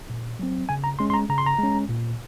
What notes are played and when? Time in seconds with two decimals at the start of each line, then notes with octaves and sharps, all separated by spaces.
0.10 A#2
0.39 F#3 C4
0.69 C#3 G#5
0.84 A#5
0.99 G#3 C#4 C6
1.10 C6
1.14 A#5
1.29 C#3 A#5
1.38 C6
1.46 A#5
1.59 G#3 C#4
1.89 A#2